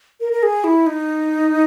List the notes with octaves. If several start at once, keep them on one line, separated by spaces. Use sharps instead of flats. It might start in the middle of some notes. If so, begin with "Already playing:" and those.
A#4
A#4
G#4
E4
D#4